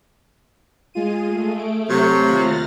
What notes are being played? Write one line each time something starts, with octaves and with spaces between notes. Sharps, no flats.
G#3 F4 G#4 D#7
A3
D7
C3 F#3 C#7
D#2 F4 F6 F#6 A6 A#6